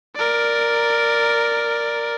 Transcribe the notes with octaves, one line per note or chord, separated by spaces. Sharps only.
A#4 D5